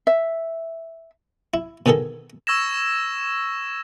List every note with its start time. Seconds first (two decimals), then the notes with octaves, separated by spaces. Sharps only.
0.07 E5
1.54 E4
1.86 B2 D3 D#3 G#4 A4
2.47 C#6 E6 G#6 A#6 E7